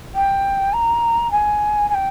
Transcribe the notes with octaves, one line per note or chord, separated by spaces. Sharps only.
G5
A#5
G#5
G#5
G5